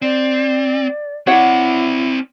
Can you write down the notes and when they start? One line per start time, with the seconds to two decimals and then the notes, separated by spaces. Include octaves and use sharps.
0.02 C4 D5
1.27 C4 E4 C#5 D5 F#5